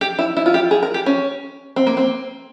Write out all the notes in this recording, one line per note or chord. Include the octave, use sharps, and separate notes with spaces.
G4
E4
E4
F4
G4
G#4
A#4
G4
C#4
C4
A#3
C4